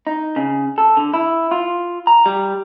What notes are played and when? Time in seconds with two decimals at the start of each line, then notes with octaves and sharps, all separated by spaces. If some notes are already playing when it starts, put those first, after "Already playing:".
0.07 D#4
0.36 C#3
0.78 A4
0.97 D3
1.14 E4
1.51 F4
2.07 A#5
2.26 G3